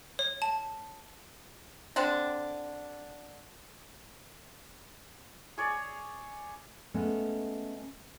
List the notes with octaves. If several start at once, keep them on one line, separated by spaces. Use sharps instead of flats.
C#5
A5
D3 C4 D4
G#4 C#5 D5
G#3 A3 B3 C#4